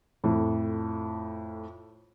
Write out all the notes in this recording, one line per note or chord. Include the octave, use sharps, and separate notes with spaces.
F2 A2